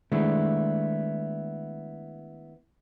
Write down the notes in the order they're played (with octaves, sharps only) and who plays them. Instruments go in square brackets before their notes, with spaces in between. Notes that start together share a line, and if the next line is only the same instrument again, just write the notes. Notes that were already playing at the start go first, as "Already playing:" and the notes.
[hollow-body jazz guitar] D#3 G#3 A3 B3 D4 E4